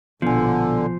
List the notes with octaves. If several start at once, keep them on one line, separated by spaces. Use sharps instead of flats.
A#1 B2 D3 F3 B3 G#5